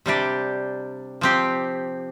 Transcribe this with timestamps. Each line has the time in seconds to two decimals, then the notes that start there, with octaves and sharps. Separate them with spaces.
0.06 C3 G3 D4 G4
1.21 F3 C4 G4